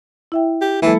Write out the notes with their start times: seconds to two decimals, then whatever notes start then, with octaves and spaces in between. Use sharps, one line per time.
0.32 E4 E5 G5
0.61 G4
0.82 E3 F#3 G#3 A#3 E4 A4